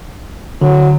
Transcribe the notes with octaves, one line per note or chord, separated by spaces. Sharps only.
D3 F#3